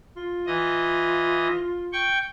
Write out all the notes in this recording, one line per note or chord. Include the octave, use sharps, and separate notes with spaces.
F4
E3 D#5
G5 C#6